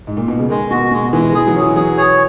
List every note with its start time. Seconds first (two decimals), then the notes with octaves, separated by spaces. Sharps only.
0.07 G#2
0.17 A#2
0.28 B2
0.39 C#3
0.50 D#3 G#3
0.70 B2 F#4
0.91 B2 G#3
1.13 E3 G#3
1.33 E3 G#4
1.47 F#3
1.55 C#4
1.61 E3
1.76 F#3 G#4
1.98 C#5